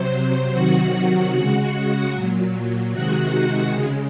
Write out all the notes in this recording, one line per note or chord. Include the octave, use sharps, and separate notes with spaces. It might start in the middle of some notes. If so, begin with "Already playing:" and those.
Already playing: C3 F#3 C5
C3 D#3 F#3 F#4 F#5
C#3 G#3 F#4 F#5
A#2 F#3
C3 D#3 G#3 F#4 F#5
C#3 G#3